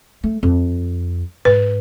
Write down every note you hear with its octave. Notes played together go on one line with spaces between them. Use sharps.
A3
F2
G#2 B4